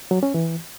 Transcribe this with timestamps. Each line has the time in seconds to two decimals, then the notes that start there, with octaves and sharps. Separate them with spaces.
0.11 F#3
0.23 C#4
0.34 E3